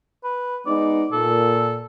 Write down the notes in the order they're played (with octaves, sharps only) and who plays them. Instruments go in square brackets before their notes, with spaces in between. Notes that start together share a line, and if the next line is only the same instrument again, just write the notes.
[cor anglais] B4
[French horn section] G#3 B3 D#4 [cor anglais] D5
[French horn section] A#2 [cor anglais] A4